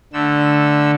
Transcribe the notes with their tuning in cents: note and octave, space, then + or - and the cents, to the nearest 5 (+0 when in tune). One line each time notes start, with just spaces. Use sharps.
D3 +0 A3 +0 E6 -5